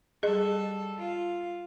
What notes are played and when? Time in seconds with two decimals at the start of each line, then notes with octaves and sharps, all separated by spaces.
0.23 G3 G#4 A4 D#5
0.99 F4